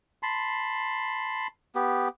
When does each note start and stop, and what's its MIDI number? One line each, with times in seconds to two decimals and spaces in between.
0.23 1.47 81
0.23 1.47 83
0.23 1.47 84
1.75 2.08 59
1.75 2.08 67